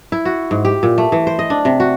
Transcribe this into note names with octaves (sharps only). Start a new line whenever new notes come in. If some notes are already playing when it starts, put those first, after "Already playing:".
E4
F#4
G#2
G4
A#2
A3
E3
C5
D#5
D4
C3
F#4